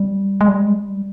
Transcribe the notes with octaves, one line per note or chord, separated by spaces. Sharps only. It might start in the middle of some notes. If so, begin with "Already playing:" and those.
Already playing: G3
G#3
G3
G#3
G3